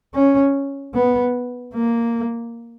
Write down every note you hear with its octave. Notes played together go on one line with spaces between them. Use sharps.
C#4
B3
A#3